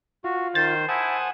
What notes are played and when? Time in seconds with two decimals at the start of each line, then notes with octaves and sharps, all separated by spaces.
0.24 F4 F#4
0.55 D#3 C5 A6
0.88 E4 C5 F#5 G#5 A5 D#6